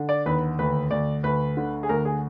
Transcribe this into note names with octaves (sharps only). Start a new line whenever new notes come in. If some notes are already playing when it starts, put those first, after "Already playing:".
Already playing: D3
D5
D#2 B4
D2 B4
D2 D5
D2 B4
D3
G#4
D2 A#4
G#4